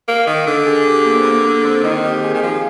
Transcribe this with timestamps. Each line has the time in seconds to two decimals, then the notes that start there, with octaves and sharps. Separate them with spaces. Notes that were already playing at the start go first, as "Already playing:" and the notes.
0.08 A#3
0.27 D#3
0.47 D3
0.66 G#4
0.86 G4
1.05 A#3
1.16 C4
1.25 A#3
1.44 A#3
1.65 C4
1.83 D#3 D#4
2.04 G4
2.23 G#4
2.34 D#3 G4
2.43 F3 G#4